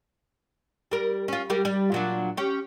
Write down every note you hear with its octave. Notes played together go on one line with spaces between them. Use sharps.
G3 A#4
C#4 F4
G3 G4 A#4
G3
A#2 F#3 D4
C#4 G4